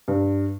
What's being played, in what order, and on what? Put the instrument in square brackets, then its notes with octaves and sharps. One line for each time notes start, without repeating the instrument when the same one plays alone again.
[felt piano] G2